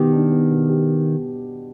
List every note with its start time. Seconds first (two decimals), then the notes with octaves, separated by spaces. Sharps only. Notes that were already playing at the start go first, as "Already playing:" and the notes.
Already playing: B2 D#3 B3 G4
0.12 D4
0.31 B3
0.51 B2
0.69 G4